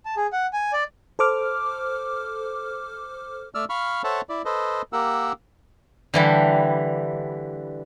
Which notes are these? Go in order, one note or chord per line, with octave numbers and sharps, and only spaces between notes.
A5
G#4
F#5
G#5
D5
A4 C5 D6 F6
A3 D5 E6 F6
F5 B5 C#6 F6
A4 C5 C#5 E5 F#5 A5
E4 D5
A4 B4 C5 D#5
A#3 G4 A#4 F#5 E6
D3 E3 G3